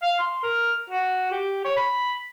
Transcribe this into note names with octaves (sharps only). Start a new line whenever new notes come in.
F5
C6
A#4
F#4
G4
C#5
B5